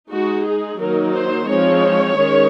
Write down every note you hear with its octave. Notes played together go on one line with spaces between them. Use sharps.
G#3 D#4 F#4
G#4
D#3 F#3 A#3 D#4 A#4
C5
F3 G#3 C4 D#4 C#5
D#3 G#3 C#4